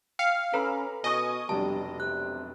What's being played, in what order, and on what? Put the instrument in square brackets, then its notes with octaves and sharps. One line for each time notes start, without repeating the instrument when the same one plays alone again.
[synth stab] F5 [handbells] G5 C#7
[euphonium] C#4 [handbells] A4 B4 [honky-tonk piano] A#5 B5 F6
[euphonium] B2 [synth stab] D#5 [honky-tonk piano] G#5 C#6 D#6
[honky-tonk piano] F1 B1 D4 [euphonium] G3 [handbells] A5
[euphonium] C3 [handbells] F#6